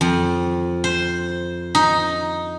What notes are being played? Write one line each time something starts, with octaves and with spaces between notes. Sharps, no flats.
F2
C5
D#4